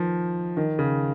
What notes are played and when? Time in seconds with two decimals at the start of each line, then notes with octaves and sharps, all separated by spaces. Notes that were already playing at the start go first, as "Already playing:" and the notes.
Already playing: D#3 F3
0.57 D#3
0.79 C#3